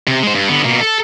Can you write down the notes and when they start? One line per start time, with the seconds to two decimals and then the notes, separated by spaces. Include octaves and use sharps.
0.07 C3
0.23 G#3 C5
0.35 G2
0.48 D3 B3
0.65 B2 A#3
0.81 A4